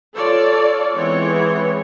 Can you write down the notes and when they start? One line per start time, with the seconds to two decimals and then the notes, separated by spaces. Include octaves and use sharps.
0.15 F4 A4 C#5 D5
0.94 E3 G#3 B3 C4 C#5